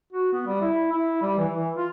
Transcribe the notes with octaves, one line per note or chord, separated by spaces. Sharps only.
F#4
B3
G3
E4
E4
G3
E3
E3
F4